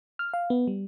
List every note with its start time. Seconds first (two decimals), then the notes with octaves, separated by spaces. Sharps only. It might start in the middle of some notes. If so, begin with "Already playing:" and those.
0.19 F6
0.34 F5
0.50 B3
0.67 G3